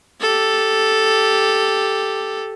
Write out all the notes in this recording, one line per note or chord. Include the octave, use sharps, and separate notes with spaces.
G4 A4